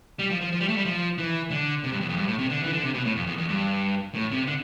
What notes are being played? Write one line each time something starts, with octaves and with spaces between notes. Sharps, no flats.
G3
F3
F3
F3
G3
A3
G3
F3
E3
D3
C3
G2
E2
F2
G2
A2
C3
D3
E3
D3
C3
B2
A2
F2
E2
E2
G2
A2
C3
D3